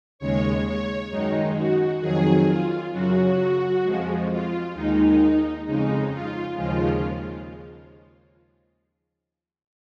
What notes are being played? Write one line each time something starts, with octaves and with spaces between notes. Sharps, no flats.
D#2 C#3 G#3 C#5
C#5
F#2 D#3 G#3 D#4
F#4
F2 D#3 F#3 G#4
F4
F#2 C#3 F#3 F#4
F2 F3 G#3
F4
D#2 D#3 G#3 D#4
F2 C#3 G#3 D#4
F4
D#2 C#3 F3 G#3 F4